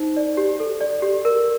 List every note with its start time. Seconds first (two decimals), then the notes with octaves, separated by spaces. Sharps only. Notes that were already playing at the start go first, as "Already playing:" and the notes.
Already playing: D#4 C5
0.17 D5
0.37 G4
0.60 A4
0.81 D5
1.02 G4
1.25 A#4